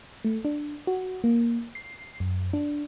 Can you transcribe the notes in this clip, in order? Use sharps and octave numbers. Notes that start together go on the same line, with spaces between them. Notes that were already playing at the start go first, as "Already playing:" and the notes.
A3
D4
F#4
A#3
C7
F#2
D4